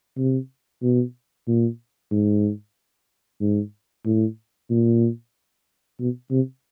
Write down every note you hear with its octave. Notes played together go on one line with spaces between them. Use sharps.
C3
B2
A#2
G#2
G#2
A2
A#2
B2
C3